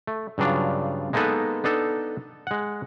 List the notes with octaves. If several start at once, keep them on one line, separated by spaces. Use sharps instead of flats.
A3
G2 C#3 F#3 D4 F4
G#3 A#3 B3 D#4 A4 B4
B3 D4 D#4 A4
G#3 F#5